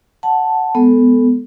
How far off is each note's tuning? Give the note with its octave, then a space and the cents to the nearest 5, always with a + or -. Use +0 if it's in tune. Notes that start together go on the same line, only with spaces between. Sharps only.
F#5 +0 A5 +0
G#3 +0 B3 +0 A4 +0